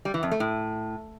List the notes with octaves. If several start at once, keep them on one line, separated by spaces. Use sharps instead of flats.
G3
E3
F2
A3
A2